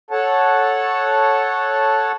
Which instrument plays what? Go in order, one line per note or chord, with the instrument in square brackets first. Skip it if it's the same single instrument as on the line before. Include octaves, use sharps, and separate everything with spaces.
[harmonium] A4 C#5 F#5 A5